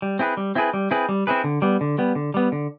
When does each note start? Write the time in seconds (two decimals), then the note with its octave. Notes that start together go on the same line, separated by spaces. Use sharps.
0.02 G3
0.19 C4 E4 G#4 B4
0.37 G3
0.55 C4 E4 G#4 B4
0.74 G3
0.91 C4 E4 G#4 B4
1.09 G3
1.27 C4 E4 G#4 B4
1.44 D3
1.62 G3 B3
1.81 D3
1.98 G3 B3
2.15 D3
2.34 G3 B3
2.52 D3